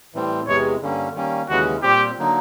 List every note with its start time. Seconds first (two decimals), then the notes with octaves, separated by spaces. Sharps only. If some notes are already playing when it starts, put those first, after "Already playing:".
0.14 A2 E3 G3 C4
0.47 E2 C3 E3 G#3 C#5
0.82 G2 D3 G3 A#3 C#4
1.15 D#3 G3 A#3 C#4
1.49 D#2 C#3 E3 G#3 C#4 F#4
1.83 A#2 G3 C4 G4
2.19 D3 F#3 A#3 D#4